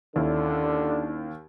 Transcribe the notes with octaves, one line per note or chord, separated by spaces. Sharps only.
D#2 D3 D#3 C#4 D4 E4